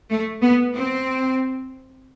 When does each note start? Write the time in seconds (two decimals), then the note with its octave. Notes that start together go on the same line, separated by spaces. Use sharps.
0.10 A3
0.42 B3
0.74 C4